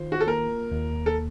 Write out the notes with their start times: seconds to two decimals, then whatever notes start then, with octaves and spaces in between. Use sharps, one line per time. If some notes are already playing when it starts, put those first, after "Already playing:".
Already playing: D#3 F4 C5
0.12 F#4
0.21 A4
0.27 A#3 A#4
0.71 D#2
1.06 A4